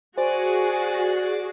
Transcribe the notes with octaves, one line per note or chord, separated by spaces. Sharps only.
F#4 G#4 C5 D5 G#5